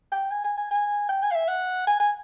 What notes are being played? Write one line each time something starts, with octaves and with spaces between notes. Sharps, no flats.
G5
G#5
G#5
G#5
G#5
G5
G#5
F5
E5
F#5
G#5
G#5